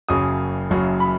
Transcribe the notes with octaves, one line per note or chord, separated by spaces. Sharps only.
F#1 F#2 C#3 F#3 D#6
F#1 F#2 C#3 F#3
B5